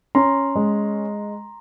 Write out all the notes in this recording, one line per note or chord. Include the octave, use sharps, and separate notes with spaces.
C#4 A#5 C6
G#3